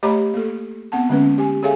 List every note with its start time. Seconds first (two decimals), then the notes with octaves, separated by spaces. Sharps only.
0.03 A3 G4 C#5 D#5 A#5 B5
0.34 A#3 A4
0.92 B3 C4 F#5 A5
1.09 D3 G#3 A#3 C#4 B4
1.38 G4 G#5
1.63 G#4 A4 C#5 E5 F5 G#5